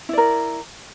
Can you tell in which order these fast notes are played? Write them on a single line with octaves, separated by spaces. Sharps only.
E4 D5 A#4